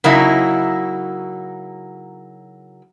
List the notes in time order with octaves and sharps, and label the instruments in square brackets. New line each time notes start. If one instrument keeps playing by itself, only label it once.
[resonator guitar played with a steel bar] C#3 F#3 A#3 D#4 E4